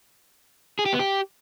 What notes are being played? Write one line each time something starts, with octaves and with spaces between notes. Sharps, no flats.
G#4
G4
B3
G4